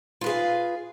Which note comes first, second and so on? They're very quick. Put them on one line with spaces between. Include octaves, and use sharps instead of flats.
F4 B4 G#4 F5